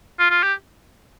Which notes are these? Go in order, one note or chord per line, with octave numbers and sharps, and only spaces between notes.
F4
F4
G4